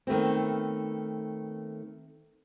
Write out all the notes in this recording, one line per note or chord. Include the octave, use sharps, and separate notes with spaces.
D#3 A3 B3 C4